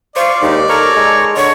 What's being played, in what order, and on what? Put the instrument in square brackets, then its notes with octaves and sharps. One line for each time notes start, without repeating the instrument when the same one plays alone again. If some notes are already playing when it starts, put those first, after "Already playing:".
[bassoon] C5 [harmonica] D5 [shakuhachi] F5 [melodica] C#6
[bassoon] D#2 [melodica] G#3 G4 [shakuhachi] D#4
[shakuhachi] A4 [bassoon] A#4 [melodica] C#5 A#5 C#6
[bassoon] G#3
[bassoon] D3 [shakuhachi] C#5